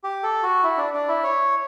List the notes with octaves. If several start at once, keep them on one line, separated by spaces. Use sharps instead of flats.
G4
A4
F#4
E4
D4
D4
E4
C#5